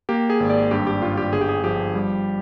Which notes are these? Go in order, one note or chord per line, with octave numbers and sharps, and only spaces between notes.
A#3 G4
G#4
G#1
D5
G2 G4
G4
G2 F4
G4
G1 G#4
G4
G#4
F3 G4
G3